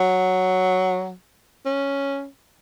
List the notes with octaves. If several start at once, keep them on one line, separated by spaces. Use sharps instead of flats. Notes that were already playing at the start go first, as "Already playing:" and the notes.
Already playing: F#3
C#4